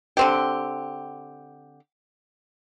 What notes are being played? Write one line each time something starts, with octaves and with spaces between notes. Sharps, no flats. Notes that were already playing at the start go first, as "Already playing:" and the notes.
D3 C4 G4